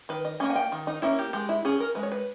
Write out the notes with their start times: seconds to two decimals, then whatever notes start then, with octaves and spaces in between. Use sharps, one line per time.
0.09 D#3 B4
0.25 D#5
0.40 A#3 C#4 G#5
0.50 G#5
0.55 G5
0.72 D#3
0.87 D#4
1.02 A#3 C#4 E4
1.19 G4
1.33 G#3 G4
1.49 E4
1.65 C#4 G#4
1.80 A#4
1.95 G#3 B4
2.03 C#5
2.12 B4